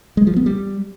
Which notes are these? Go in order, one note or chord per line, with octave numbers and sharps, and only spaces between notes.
G#3
F3
B3
G3